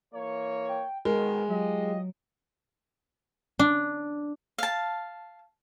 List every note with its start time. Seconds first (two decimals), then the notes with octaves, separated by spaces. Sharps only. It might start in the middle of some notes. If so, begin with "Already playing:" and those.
0.13 E3 A#3 C#5
0.69 G5
1.05 G#2 B2 D#3 G#3 A#4
1.49 F#3 F4 G4 D#5
3.59 D4
4.58 F5 A5